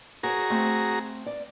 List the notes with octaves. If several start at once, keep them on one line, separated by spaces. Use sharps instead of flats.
F#4 G#4 A#4 C#5 A#5
A3 C4
D5